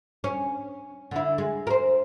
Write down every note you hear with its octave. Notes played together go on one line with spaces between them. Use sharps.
C#4
D3 E4
G#3
A#4 C5